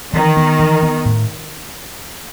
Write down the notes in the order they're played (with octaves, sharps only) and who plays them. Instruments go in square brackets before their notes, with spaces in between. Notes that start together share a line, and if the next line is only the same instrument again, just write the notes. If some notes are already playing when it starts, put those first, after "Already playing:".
[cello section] D#3 [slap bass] E3
[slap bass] B3
E3
B3
A2